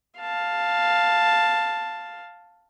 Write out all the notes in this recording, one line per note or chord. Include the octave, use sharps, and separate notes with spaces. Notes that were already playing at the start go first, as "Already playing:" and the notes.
F5 A5